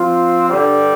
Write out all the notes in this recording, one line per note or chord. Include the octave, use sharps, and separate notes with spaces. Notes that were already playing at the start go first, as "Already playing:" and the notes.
Already playing: F3 C4 F4
G2 D3 G3